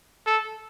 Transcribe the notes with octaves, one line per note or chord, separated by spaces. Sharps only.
A4